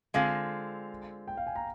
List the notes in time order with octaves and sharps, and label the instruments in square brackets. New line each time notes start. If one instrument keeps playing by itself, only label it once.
[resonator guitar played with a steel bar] D3 G#3 C4 F4 [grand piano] F5
[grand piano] G5
F5
G#5
A#5